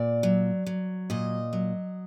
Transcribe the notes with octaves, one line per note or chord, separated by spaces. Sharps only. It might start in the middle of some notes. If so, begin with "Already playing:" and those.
Already playing: A#2 D5
F#3
F#3
A#2 D#5
F#3